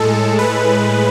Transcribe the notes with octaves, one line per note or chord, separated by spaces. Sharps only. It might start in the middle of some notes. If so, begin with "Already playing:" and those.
Already playing: A2 G#3 A4
B4